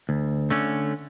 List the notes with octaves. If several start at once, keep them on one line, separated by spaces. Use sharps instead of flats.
D2
D3 A3 C#4